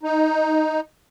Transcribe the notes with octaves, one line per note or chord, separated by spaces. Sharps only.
D#4